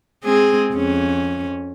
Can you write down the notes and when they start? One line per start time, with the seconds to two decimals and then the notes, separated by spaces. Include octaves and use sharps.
0.24 G#3 C4 G#4
0.73 F2 C#4